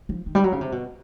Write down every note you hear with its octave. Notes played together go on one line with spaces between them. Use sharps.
F3
D#3
G3
F#3
C#3
C3
B2